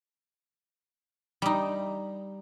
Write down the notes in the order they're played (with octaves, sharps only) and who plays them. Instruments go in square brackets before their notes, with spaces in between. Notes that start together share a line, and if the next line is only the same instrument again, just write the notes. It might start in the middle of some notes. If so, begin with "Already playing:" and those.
[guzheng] G3 D#4